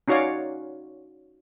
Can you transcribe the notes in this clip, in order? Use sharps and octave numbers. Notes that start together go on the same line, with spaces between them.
C#4 D#4 F#4 C#5 D5 F5